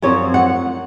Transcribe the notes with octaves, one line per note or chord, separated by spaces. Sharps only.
F#2 F3 C4 C#5
F#5